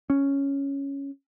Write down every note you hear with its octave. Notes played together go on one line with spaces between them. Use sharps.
C#4